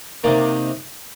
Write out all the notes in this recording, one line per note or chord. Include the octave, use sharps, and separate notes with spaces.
C3 D#3 A#3 D5